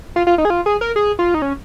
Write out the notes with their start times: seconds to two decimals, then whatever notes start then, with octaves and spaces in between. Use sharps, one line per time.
0.16 F4
0.27 F4
0.38 D#4
0.45 G#4
0.50 F4
0.66 G#4
0.81 A#4
0.96 G#4
1.19 F4
1.34 D#4
1.42 C#4